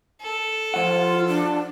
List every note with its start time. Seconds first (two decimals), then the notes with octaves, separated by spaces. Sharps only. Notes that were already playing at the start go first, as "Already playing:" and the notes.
0.22 A4
0.74 F3 F4 F#5
1.28 D4